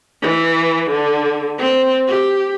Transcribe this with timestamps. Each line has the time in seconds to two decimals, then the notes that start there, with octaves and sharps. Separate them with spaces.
0.22 E3
0.91 D3
1.59 C4
2.08 G4